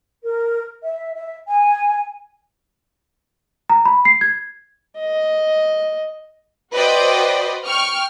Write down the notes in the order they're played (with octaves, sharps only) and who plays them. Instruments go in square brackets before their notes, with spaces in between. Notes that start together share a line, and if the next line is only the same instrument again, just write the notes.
[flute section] A#4
E5
E5
G#5
[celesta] A#5
B5
C7
G#6
[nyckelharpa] D#5
[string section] F#4 B4 C5 D5 D#5 G5
G5 C#6 F6